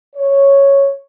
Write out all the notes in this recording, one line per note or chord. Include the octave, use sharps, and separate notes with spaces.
C#5